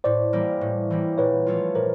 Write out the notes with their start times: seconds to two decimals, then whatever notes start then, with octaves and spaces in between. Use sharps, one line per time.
0.04 A2 C5 D5
0.33 E3 G3 A#3
0.61 A2
0.90 E3 G3 A#3
1.18 A#2 B4 C#5
1.46 F3 A3 C#4 F4
1.75 A#2 A#4 C5